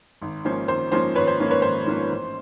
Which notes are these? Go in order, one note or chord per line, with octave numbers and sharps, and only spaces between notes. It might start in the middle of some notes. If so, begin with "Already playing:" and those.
G#1
G#2 F3 A#3 C#4 C5
G#1 C5
G#2 F3 A#3 C#4 C5
G#1 B4 C#5
C5
G#2 F3 A#3 C#4
B4 C#5
G#1 C5
G#2 F3 A#3 C#4
A1